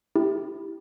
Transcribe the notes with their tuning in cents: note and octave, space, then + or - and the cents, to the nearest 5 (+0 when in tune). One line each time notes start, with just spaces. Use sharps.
E4 +0 G4 +0